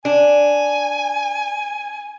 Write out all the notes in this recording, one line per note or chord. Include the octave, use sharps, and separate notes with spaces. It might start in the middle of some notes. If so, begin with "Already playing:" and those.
D4 G#5